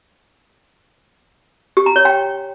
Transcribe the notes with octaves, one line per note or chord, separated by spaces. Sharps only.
G4
A#5
C#5
G5